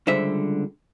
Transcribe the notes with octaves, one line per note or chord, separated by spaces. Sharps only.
C#2 D3 G3 C5 E5